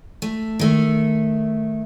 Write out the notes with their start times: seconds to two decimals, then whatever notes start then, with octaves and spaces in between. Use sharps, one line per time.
0.22 A3
0.59 D#3 A3